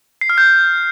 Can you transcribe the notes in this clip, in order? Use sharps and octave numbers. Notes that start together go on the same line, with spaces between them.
C7
F6
G6